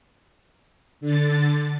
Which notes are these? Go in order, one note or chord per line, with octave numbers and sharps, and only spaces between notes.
D3 A6